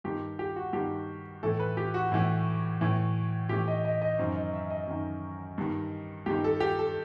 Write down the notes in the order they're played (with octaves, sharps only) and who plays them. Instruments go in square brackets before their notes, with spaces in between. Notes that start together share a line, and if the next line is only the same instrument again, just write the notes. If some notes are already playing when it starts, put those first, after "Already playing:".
[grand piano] G2 D#3 G4
G4
F#4
G2 D#3 G4
A2 E3 A4
B4
G4
F#4
A2 E3
A2 E3
A2 E3 G4
D#5
D#5
D#5
F#2 D#3 C5
D#5
E5
D#5
F#2 D#3
G2 D#3
G2 D#3 G4
A4
G4
A4